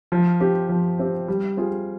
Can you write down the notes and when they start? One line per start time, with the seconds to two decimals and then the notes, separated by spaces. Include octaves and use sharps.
0.12 F3
0.40 C4 G4
0.69 F3
0.99 C4 G4
1.28 G3
1.57 C4 F4 G#4